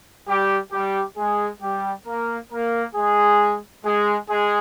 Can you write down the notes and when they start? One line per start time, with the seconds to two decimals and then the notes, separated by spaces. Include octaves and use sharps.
0.28 G3 G4
0.73 G3 G4
1.17 G#3 G#4
1.62 G3 G4
2.06 A#3 A#4
2.52 A#3 A#4
2.95 G#3 G#4
3.85 G#3 G#4
4.30 G#3 G#4